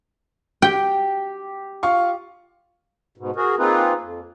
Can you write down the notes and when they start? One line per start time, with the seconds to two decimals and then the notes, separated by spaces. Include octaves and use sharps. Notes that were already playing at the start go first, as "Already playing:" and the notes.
0.62 G4 G5
1.83 F4 F5 C#6
3.18 G#2 B2
3.36 F#4 G#4 A#4
3.58 A#3 C4 D#4 F4 G#4 B4
4.01 F2